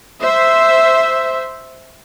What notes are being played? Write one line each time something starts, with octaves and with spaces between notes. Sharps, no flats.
C5 E5